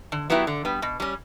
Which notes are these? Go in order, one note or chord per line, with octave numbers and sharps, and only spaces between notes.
D3
F#3 B3 E4 G4
D3
G3 B3
B2
G3 C#4